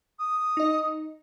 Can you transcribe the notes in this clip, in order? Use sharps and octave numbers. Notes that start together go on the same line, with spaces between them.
D#6
D#4 D#5